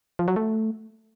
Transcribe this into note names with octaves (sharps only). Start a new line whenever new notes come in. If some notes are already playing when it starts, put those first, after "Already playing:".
F3
F#3
A3